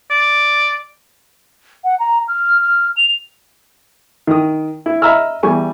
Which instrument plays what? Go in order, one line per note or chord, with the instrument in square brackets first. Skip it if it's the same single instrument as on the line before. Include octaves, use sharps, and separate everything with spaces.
[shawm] D5
[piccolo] F#5
A#5
F6
F6
F7
[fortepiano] D#3 D#6
E4
D#5 E5 A#5 B5 E6 F6
E2 E3 G3 G#5 C#6